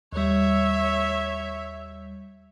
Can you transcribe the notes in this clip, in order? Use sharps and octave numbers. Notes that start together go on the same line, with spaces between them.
D#2 G3 C#5 E5